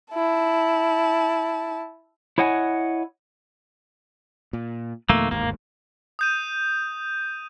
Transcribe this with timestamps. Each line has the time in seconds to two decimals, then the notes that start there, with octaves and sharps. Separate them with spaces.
0.14 E4 A5
2.38 E4 C#5 D#5 F#5 G#5
4.53 A#2
5.10 F2 B2 D#3 A3 A#3
5.31 G1 D#2 G#2 A#3
6.19 D#6 G6 D#7